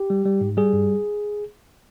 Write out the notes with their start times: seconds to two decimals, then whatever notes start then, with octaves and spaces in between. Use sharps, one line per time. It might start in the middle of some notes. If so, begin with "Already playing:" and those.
Already playing: G4
0.10 G3
0.25 G3
0.41 G#2
0.57 G3 G#4
0.73 G2